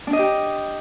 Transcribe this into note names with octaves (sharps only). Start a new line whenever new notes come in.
D4
D#5
G4